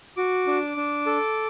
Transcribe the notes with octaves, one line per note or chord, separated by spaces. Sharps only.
F#4 D6
D4
D4
A4